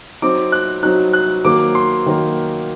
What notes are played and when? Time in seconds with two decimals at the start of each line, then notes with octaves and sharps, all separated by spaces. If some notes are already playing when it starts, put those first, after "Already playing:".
0.22 F#3 C4 D#4 D6
0.52 F#6
0.83 F#3 C4 D#4 F#6
1.13 F#6
1.45 D#3 F#3 A#3 D6
1.75 C6
2.06 D#3 F#3 A#3